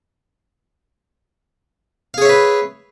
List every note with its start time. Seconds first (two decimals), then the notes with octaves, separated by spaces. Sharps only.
2.14 F5
2.18 G#4
2.22 C#5
2.25 E5
2.29 B4